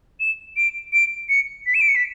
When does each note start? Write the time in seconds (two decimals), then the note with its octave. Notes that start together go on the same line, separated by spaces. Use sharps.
0.20 E7
0.57 D7
0.93 D7
1.29 C#7
1.66 B6
1.74 E7
1.81 D7
1.88 C#7
1.96 B6